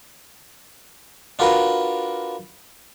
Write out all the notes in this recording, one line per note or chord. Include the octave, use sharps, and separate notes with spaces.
D4 F4 F#4 A#4 B4